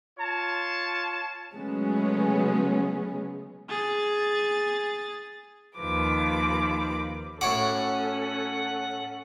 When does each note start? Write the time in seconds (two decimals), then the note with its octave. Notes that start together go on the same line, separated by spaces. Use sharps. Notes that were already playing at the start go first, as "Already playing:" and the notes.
0.18 F4 C#5 A5
1.53 C#3 F#3 G#3 A3 B3 C#4
3.69 G#4 A6
5.77 D#2 D#3 F3 B4 D6
7.41 A2 C#4 F#4 A4 C#5 F#5 D6